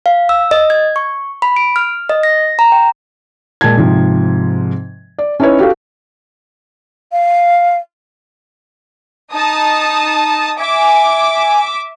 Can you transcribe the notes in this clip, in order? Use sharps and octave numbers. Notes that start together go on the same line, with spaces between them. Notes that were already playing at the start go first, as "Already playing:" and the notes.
F5
E6
D#5
G#6
C#6
B5
D7
F6
D#5
A#6
A#5
G5
A#2 G#3 A5 G#6
G#2 C3 F3
D5
C#4 D#4 E4 B4 C#5
F#4 G4 A4 F5
F5
D#4 A5 D#6
E5 G#5 D6